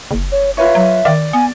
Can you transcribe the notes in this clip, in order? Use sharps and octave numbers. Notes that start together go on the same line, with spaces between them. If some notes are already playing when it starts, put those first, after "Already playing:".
F#1
C#5
F4 B4 C#5 E5
F#3
D#3 D5
B3 G#5